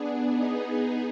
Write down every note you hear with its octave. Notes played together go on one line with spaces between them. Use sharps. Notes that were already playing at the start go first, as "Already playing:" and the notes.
Already playing: B3 D4 G#4
B3 D#4 G#4